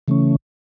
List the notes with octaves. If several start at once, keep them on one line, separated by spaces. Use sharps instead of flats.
C#3 E3 A3 C#4